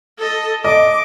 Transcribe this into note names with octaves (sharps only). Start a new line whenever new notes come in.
A4 D#5
D#5 D6